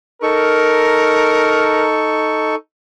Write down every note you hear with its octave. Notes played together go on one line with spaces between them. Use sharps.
D#4 A4 A#4 C#6